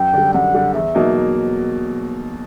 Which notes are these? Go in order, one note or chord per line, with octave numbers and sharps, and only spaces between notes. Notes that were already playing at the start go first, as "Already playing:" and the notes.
Already playing: F#2 G5
D3 G3
F#2 F#5
D3 G3
E2 E5
B2 F#3 A#3 D#4